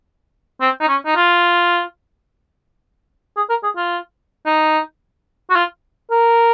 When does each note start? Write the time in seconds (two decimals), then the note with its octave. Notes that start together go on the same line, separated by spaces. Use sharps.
0.61 C4
0.81 D#4
0.88 C#4
1.05 D#4
1.16 F4
3.37 G#4
3.50 A#4
3.63 G#4
3.77 F4
4.46 D#4
5.50 F#4
5.56 F4
6.11 A#4